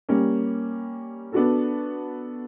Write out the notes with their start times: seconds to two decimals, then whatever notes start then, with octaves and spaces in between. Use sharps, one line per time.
0.09 G3 A#3 C#4
1.32 B3 D4 F#4 A4